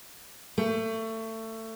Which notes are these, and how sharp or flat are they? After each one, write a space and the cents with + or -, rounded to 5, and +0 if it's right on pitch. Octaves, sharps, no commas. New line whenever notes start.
A3 +25